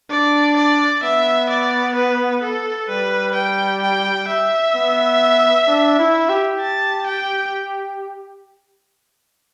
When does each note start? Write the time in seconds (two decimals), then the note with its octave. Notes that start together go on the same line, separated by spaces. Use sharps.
0.10 D4 D5
0.57 D5
1.03 B3 E5
1.49 D5
1.96 B4
2.42 A4
2.89 G3 B4
3.35 G5
3.82 G5
4.28 E5
4.75 B3
5.67 D4
5.99 E4
6.29 G4
6.61 A5
7.07 G5